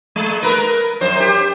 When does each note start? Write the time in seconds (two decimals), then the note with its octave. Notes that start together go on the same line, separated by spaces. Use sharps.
0.16 G#3
0.43 A#4 B4
1.01 F#2 C5
1.20 G4